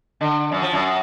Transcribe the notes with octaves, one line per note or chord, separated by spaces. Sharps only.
D3
F#2
F3
F#2